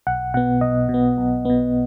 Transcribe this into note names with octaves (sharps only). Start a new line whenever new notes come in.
B1 F#5
B2 B3 F#5
B1 D#5
B2
B3
B1
B2 B3